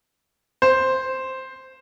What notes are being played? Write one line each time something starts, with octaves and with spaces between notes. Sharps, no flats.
C5